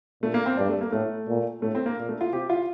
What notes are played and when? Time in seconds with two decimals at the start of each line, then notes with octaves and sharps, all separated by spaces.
0.22 A#2 A3
0.34 A#3
0.46 C4
0.57 G2 D4
0.69 A3
0.81 A#3
0.92 A2 A3
1.28 A#2
1.62 A2 A3
1.75 C4
1.86 A#3
1.98 A#2
2.09 A3
2.21 F4
2.32 C3 G4
2.50 F4